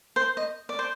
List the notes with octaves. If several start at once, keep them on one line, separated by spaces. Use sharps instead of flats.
C5
D#5
D5
C5